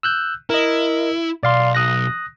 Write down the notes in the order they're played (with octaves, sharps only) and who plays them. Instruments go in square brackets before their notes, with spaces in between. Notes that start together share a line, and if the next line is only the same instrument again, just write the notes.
[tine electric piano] E6 F#6 G6
[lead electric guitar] E4 [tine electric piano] A#4 D#5
[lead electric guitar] B1 [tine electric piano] D5 F5 C6
[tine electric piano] D#6 F#6 A#6